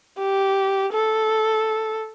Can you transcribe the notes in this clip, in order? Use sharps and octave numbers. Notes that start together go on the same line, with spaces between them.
G4
A4